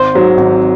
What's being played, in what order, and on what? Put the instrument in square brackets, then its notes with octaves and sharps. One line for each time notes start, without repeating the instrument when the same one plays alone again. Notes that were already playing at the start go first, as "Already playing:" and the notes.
Already playing: [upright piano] G#1 [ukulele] C5
[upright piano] G#2 F#3 C4
G#1